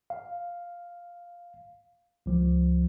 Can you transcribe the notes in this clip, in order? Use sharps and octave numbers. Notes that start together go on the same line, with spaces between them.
F5
C#2 F3